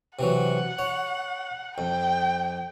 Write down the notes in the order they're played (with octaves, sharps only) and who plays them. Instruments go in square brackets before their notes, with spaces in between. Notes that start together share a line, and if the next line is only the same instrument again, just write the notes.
[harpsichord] C3 E3 F#3 [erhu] F#5
[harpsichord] C#5
[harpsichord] F2 [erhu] G5